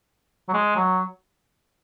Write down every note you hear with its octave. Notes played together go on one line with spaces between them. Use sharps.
F#3
G#3
F#3